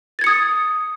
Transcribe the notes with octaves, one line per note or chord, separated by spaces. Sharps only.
D#6 G#6 A6 C#7